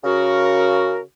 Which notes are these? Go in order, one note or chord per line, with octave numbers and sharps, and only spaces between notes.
C#3 F#4 A#4